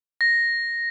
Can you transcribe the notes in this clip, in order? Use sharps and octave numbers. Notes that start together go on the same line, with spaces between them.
A#6